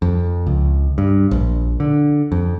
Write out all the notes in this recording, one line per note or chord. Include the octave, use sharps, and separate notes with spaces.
F2
C#2
G2
A#1
D3
F2